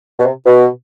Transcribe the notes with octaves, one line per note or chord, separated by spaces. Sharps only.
B2
C3
B2